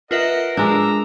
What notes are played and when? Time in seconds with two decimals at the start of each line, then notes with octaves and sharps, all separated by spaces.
0.11 F4 A#4 B4 D#5 E5 F#5
0.57 G#3 D4 A#5 E6